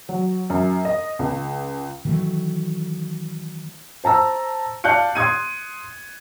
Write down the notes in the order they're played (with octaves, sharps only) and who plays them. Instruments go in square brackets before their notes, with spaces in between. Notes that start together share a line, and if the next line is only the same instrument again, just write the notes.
[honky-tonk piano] F#3
F#2
D#5
C#2
[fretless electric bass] D#3 E3 F#3 A3
[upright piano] C5 A5 A#5 E6
D5 F5 A5 F#6 G6 C#7
C6 D#6 G#6 D#7